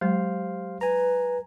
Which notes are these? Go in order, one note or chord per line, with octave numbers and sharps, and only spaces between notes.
F#3 G#3 G4 C5 F5
B4 G#5 A#5